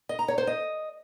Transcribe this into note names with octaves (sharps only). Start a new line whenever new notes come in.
D#5
A#5
C#5
C5
D#5